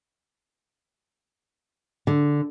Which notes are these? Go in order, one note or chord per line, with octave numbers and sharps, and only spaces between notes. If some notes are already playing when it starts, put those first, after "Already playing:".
D3